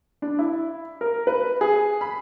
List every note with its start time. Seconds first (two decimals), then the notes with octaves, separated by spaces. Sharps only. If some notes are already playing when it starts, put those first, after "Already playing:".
0.22 D4
0.39 E4
1.01 A#4
1.27 B4
1.61 G#4
2.01 B5